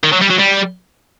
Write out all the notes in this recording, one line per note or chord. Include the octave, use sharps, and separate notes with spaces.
D#3
F#3
G3
F#3
G3